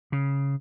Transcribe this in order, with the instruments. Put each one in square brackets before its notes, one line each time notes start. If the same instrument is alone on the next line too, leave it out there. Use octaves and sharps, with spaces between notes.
[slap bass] C#3